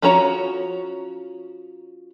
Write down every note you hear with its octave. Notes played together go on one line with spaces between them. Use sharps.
F3 C#4 F#4 C#5 A#5